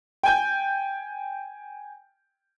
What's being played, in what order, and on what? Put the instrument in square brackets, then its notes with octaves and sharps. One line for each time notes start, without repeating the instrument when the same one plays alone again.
[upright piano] G5 G#5 G6